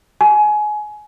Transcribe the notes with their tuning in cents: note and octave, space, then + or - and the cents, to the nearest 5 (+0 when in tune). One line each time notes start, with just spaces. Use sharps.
G#5 +25